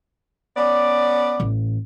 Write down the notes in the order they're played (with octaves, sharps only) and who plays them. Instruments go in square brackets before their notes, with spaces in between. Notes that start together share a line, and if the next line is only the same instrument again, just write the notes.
[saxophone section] B3 C#4 D5
[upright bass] A1